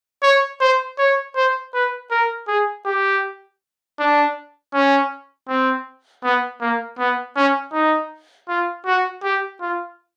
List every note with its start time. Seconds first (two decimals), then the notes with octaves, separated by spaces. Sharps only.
0.23 C#5
0.61 C5
0.99 C#5
1.36 C5
1.74 B4
2.11 A#4
2.48 G#4
2.86 G4
3.99 D4
4.74 C#4
5.49 C4
6.24 B3
6.61 A#3
6.99 B3
7.36 C#4
7.73 D#4
8.49 F4
8.86 F#4
9.23 G4
9.61 F4